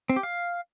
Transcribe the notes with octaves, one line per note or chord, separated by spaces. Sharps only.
C4
G4
F5